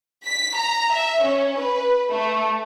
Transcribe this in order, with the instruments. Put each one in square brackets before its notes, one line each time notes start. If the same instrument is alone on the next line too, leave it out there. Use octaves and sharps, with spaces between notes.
[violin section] B6
A#5
E5
C#4
B4
A3